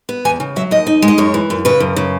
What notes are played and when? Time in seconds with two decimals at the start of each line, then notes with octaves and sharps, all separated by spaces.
0.09 B3
0.25 E2 G#5
0.40 C#3
0.56 F#3 E5
0.71 D#2 D#5
0.87 D#4
1.02 G#3
1.08 D#5
1.18 F#2 C#5
1.34 E3
1.50 F#2
1.65 C#3 B4
1.80 F#2
1.96 C#3